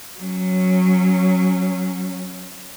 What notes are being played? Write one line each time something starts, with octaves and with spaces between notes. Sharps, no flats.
F#3 C#4